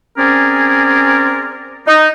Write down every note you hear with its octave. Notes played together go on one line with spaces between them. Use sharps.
C4 C#4 G#4 A#4 D5
D#4